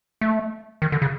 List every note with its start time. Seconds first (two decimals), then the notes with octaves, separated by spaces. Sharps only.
0.21 A3
0.82 D#3
0.92 D3
1.02 C#3